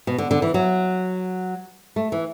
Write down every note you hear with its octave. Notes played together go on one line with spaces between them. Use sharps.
B2
D3
D3
E3
F#3
A3
E3